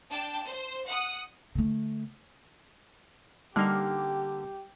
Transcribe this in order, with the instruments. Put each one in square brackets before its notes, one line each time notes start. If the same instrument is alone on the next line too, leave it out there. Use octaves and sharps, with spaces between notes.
[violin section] D4 G5 A5
C5
F#5 D#6
[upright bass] D3 A3
[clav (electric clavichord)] D3 A#3 [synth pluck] G3 D#4 F6 [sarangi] G4